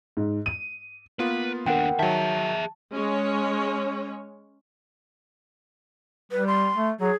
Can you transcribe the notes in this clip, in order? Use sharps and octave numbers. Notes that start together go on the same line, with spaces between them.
G#2
D#7
A#3 B3 F4 B4
D#2 D4 A#4 F#5 G5
D#3 F#3 G#4 E5 A5
G#3 C#4 C#5
G3 B4
C6
A3
F#3 G#4